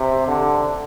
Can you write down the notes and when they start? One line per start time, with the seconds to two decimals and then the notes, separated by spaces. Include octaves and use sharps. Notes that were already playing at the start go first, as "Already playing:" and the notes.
Already playing: C3
0.28 D3